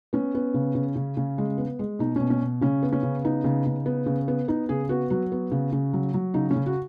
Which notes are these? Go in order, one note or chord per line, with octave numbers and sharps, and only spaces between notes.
B3 C#4
B3
C#3
C#3
C#3
C#3
G#3
B3
G#3
B2 D#4
B2 C#4
C#4
B2
C#3 C#4
B3
C#4
C#3
B3 D#4
C#3
C#3
B3
C#3
B3
B3 D#4
C#3 G#4
B3 F#4
F#3 F#4
B3
C#3
C#3
F#3
F#3
C#3 D#4
C#4
C#3
F#4